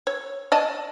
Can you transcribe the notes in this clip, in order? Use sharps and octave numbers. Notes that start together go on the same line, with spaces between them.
C#5
D5 D#5 A5